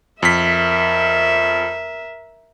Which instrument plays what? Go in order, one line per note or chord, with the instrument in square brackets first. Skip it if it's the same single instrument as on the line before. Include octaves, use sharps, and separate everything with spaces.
[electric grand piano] F2 B6 [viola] A#4 E5